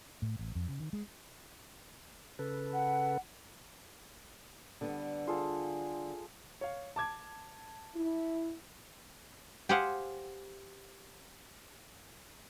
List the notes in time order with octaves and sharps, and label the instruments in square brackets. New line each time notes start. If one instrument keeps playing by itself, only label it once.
[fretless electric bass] A2
A1
F2
C#3
D#3
G#3
[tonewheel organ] C#3 A4 B4
[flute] F#5
[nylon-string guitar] D3 G3 B3
[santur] F4 G#4 A4
[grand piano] C#5 F5
A5 D6 G#6
[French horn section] E4
[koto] G4 G#4 C5 F5 F#5